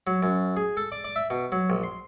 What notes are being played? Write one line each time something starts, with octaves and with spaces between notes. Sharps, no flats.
F#3
F#2
G#4
A4
D5
D5
E5
B2
F#3
A#1
C6